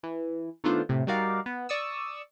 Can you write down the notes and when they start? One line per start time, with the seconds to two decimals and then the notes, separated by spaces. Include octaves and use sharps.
0.03 E3
0.64 D#3 A3 B3 D4 F4 C5
0.89 A2 C3
1.07 G3 D#4 F#4 A#4 D5 F5
1.46 B3
1.69 D5 C#6 D#6 E6